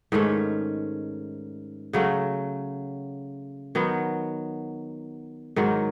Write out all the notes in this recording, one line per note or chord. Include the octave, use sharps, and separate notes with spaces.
G#2 D#3 A3 C#4
C#3 F#3 A3
D#3 F#3 B3
G#2 D#3 F#3